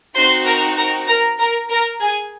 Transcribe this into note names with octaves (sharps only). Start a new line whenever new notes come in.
C4 D#4 F#4 C5 C6
A#4 A#5
A#4 A#5
A#4 A#5
A#4 A#5
A#4 A#5
G#4 G#5